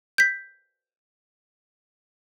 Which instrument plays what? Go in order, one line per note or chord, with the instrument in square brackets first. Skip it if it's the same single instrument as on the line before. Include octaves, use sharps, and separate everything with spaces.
[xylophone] G6 B6